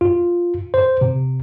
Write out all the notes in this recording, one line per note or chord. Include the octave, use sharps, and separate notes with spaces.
F4
C5
C3